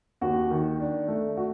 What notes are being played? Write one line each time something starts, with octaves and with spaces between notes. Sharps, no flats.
D#2 F#4
D#3
D4
A3
F#4